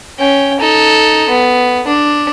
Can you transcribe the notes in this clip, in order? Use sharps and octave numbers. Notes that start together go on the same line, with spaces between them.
C#4 G5
D#4 A4
B3
D4